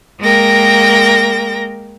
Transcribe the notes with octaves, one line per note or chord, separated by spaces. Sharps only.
G#3 A#3 A#4 G5 A#6